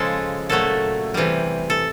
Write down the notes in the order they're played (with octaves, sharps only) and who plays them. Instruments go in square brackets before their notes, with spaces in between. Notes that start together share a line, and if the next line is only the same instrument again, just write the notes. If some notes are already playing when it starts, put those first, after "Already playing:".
Already playing: [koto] C#3 F3 G#3 A4
A#2 F#3 A3 A4
C3 E3 G3
A4